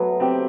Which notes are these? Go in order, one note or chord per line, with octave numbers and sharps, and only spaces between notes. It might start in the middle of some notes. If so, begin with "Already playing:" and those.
Already playing: F#3 A3 B3
C4 G4